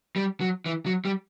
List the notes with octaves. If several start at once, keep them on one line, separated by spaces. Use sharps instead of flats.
G3
F#3
E3
F#3
G3